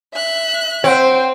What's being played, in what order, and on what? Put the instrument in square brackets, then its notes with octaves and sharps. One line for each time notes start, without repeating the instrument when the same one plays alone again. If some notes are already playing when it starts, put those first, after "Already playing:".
[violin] E5 F#6
[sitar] C4 [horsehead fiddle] C5 G5 [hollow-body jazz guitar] C#5 F#5